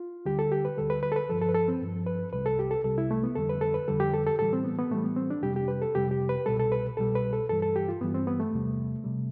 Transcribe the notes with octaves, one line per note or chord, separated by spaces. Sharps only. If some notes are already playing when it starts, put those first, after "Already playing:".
Already playing: F4
D2 D3 G3 G4
A4
G4
B4
D2 D3 G3 A4
B4
B4
A4
B4
G2 F3 A4
A4
B4
A4
C4
G2 F3
B4
C2 C3 G3 B4
A4
G4
A4
C2 C3 G3 A4
E4
A3
B3
F2 D3 G3 A4
B4
A4
B4
F2 D3 G3 A4
G4
A4
A4
A2 E3 G3 A4
C4
B3
B3
A2 E3 G3 A3
B3
C4
D4
F2 C3 G3 G4
G4
B4
A4
F2 C3 G3 G4
G4
B4
C2 B2 G3 A4
A4
B4
C2 B2 G3 A4
B4
A4
G2 E3 G3 A4
A4
G4
F4
G2 E3 G3 B3
C4
B3
A3
E2 C3 G3
C3 G3